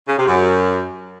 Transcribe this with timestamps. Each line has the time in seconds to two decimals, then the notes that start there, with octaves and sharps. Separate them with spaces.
0.08 C#3
0.18 C3
0.28 F#2